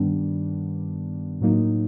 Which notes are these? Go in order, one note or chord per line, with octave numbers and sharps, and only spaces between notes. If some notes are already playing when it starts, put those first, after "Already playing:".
Already playing: G2 D#3 G3 B3 D4
A2 F#3 A#3 D#4